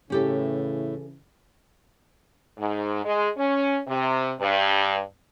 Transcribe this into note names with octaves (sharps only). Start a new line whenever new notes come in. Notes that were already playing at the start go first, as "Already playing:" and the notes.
A2 C#3 E3 C#4 G4 A4
G#2
G#3
C#4
C3
G2